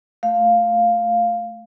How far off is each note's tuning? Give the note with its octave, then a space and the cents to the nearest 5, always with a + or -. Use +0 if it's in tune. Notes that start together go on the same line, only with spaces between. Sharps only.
A3 +0 F5 +0